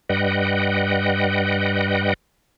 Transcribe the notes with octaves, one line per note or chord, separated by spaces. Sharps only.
G2 G3 B4 D#5 F#5 G5